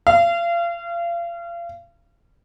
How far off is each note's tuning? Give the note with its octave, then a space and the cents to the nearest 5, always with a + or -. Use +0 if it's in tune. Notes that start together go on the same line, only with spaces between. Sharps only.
F5 -35